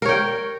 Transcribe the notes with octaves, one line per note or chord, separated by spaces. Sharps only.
A#4 C#5 G5